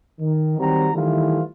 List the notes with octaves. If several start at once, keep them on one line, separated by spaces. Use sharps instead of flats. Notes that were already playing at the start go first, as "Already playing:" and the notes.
D#3
D#3 F#3 G3 C4 F#4 A#5
D#3 E3 G3 A3 E4 F4